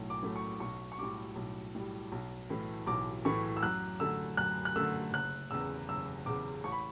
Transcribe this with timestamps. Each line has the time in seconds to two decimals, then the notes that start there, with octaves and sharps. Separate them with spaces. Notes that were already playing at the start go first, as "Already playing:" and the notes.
Already playing: B1 A2 F#3 A3
0.10 D6
0.23 A2 F#3 A3
0.36 C#6
0.60 B1 C#6
0.92 C#6
0.98 A2 G3 D6
1.36 B1
1.75 A2 G3
2.12 B1
2.50 A2 E3 A3
2.87 B1 D6
3.25 A2 E3 A3 C#6
3.57 E6
3.63 F#2 F#6
4.00 D3 A3 E6
4.37 F#2 F#6
4.65 F#6
4.76 D3 A3 E6
5.13 F#1 F#6
5.51 E2 C#3 E6
5.89 F#1 E6
6.26 E2 C#3 D6
6.64 A1 C#6
6.72 B5